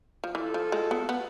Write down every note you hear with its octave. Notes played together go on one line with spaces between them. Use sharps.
F3
E3 F4 A4
F3
G#3
B3
B3